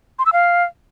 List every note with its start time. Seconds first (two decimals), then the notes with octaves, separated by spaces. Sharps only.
0.19 C6
0.26 E6
0.33 F5